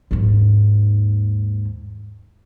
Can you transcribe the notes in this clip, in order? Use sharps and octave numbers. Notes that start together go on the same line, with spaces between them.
D#2 G#2